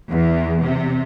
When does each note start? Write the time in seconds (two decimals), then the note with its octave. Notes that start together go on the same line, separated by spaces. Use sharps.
0.12 E2
0.62 C3